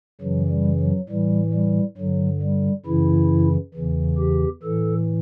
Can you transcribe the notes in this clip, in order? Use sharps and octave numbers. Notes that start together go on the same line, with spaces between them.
F#2 C#3 E3 F#3
G3
F#3
A2 E3 G3
G3
G2 D3 F#3
G3
F#2 C#3 E3 E4
E2 C#3 E3
G4
A2 E3 A4